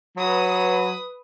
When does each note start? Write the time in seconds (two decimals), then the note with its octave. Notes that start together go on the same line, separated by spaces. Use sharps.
0.17 F#3 B4 D#6